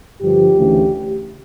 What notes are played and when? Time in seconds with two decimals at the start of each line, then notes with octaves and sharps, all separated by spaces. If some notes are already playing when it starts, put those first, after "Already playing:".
0.20 G2 D3 F3 G4
0.55 D2 C#3 E3 A3